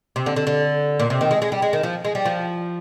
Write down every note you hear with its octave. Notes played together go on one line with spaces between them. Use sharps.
C3
D3
D3
D3
A#2
C3
D#3
G#3
G#3
G3
G#3
D#3
F3
G#3
G3
F3